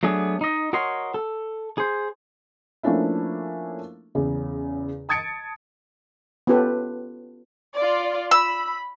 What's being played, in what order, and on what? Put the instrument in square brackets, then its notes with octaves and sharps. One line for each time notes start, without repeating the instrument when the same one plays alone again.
[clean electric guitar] F#3 A3 B3 D4 G#4
D#4 D#5
F#4 A#4 C#5 D#5 C6
A4
G#4 C5
[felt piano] F3 A3 A#3 C#4 D4 E4
E2 C#3
A5 D#6 G#6 A6 C#7 D7
[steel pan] B3 C#4 F4 G4 A4 B4
[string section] F4 D5
[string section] B5 [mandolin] E6